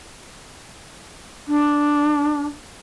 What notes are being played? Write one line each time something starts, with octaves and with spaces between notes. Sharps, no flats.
D4